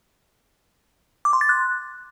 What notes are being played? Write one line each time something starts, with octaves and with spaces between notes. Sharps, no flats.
D6
C6
A6
F#6